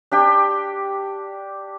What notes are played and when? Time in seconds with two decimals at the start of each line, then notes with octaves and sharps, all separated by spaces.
0.12 D4 G4 G5